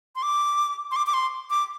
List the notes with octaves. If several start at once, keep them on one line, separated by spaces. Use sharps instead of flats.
C6
D6
C6
D6
D6
C6
D6